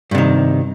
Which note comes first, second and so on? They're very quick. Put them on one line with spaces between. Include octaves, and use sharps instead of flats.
G2 C3 D#3